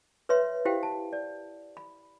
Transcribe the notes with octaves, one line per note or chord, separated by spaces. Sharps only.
B4 C#5 E5 C6
E4 G4 C5 F5 G5
A5
D5
B5